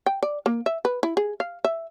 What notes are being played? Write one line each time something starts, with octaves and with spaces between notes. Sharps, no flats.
G5
D5
A#3
E5
B4
E4
G#4
F5
E5